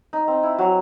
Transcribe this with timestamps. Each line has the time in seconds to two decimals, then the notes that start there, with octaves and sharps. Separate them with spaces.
0.13 D#4
0.28 C4
0.43 E4
0.58 F#3 F#4